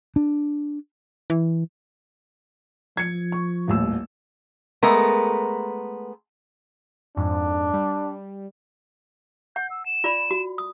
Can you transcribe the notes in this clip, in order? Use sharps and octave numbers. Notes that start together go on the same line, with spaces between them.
D4
E3
F3 G#6 C#7
C#6
D#1 A1 E6
G#3 A3 B3 A#4
F2 G#2 D4
G3
F#5 G6
E6
E7
F4 D5 B5
F#4
D#6